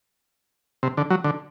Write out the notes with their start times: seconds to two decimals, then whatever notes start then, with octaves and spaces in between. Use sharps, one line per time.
0.83 C3
0.97 D3
1.10 F#3
1.24 D3